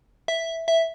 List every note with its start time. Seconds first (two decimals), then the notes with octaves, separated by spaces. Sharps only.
0.28 E5
0.68 E5